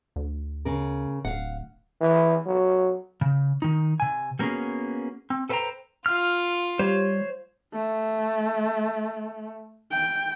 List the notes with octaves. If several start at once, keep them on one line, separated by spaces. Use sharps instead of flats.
D2
C#3 A#4
D1 F5 F#5
E3
F#3
C#3
D#3 D#4
C3 G#5
G3 A#3 B3 C#4 F#4 G#4
C4
A4 B4 C5 F5 G5 A#5
F4 F6
G3 C5 C#5
A3
G5